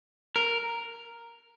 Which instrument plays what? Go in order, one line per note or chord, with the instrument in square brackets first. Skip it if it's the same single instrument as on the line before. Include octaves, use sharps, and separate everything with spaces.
[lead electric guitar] A#4